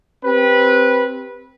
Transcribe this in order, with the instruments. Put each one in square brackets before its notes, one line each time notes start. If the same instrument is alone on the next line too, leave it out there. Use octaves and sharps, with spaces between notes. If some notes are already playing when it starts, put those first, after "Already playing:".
[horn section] C4 G4 B4